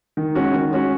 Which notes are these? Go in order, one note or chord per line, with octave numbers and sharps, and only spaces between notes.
D#3
G#3 C#4 F#4
D#3
G#3 C#4 F#4